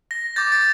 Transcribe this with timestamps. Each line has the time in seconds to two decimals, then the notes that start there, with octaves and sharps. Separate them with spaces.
0.11 A#6
0.36 D6 G6 A6
0.52 A6